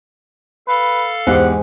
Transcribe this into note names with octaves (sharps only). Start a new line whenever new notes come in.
A4 B4 F5
E2 G#2 G4 F#5